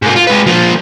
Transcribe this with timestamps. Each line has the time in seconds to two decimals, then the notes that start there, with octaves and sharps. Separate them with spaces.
0.02 G#2 A#3
0.16 F4
0.27 G#3 B4
0.46 F3 A#3